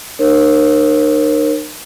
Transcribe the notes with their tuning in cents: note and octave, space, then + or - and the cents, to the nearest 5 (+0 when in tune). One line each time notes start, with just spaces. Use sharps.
D#4 -45 A#4 +10 C#5 -45